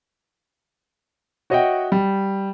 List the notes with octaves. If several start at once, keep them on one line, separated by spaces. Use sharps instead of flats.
F#4 C#5 D#5 E5 F#5 G5
G3